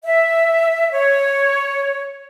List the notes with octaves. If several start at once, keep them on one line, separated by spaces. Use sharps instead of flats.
E5
C#5